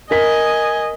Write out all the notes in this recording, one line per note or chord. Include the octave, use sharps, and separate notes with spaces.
A#4 D#5 G#5 B6